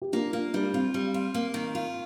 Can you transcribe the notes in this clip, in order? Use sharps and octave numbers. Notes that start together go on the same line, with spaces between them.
G4
A#3 D4 F4
A#3 D4 F4
G3 D4
C4 F4
G3
F4
A#3
D#3
F4